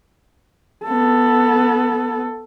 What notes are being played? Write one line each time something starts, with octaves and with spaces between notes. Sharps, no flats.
B3 A4